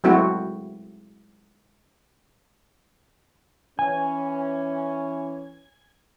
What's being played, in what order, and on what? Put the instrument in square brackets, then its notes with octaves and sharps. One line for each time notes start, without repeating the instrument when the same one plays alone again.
[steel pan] F#3 G#3 A3 C4 E4 F#4
[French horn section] E3 C#4 [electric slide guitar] G#5